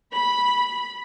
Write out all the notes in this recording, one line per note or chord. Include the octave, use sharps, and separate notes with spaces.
B5